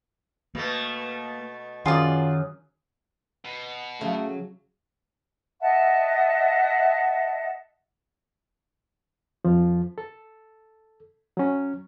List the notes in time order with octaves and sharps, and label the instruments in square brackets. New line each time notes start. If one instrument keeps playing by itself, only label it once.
[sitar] B2 A3 [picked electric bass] A#3
[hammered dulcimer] F#2 G#4 A#5 [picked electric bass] D#3 [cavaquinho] F4 D5
[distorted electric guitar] B2
[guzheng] C#3 [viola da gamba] F#3 [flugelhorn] A3
[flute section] D#5 E5 F#5 A5
[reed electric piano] F2 F3
A4
F#3 C#4